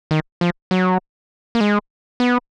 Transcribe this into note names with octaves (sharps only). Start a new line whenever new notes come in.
D#3
F3
F#3
A#3
G#3
B3